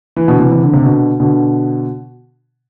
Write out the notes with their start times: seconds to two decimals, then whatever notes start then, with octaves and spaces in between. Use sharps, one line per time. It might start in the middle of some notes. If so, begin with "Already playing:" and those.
0.16 E3
0.28 B2 D3
0.40 C3 E3
0.51 C3 E3
0.63 D3
0.73 C3
0.83 B2 D3
1.19 B2 D3